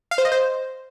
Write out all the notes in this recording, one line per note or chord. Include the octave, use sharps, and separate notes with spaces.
F5
C5
D#5
C5